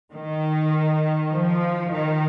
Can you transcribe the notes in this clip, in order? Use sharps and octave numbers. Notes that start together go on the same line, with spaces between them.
D#3
F3
D#3